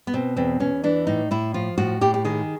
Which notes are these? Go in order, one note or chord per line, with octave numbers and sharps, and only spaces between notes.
B3
B2 C4
E2 C4
E2 C#4
E3 D4
A2 D#4
A2 E4
F3 F4
A2 F#4
A2 G4
G4
D#3 G#4